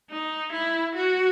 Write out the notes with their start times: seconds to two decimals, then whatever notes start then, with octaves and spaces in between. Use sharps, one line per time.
0.10 D#4
0.53 E4
0.95 F#4